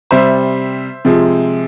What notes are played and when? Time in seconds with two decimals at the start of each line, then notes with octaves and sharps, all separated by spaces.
0.11 C3 G3 C5 E5
1.05 C3 F3 G#3